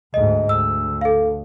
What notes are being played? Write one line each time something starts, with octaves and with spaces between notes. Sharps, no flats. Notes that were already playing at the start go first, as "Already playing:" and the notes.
D2 G#2 D#5
D2 E6
A4 F5